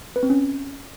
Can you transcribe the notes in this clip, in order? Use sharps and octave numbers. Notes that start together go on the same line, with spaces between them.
B4
C4
C#4